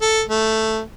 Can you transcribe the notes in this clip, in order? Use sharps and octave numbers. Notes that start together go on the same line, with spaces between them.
A4
A3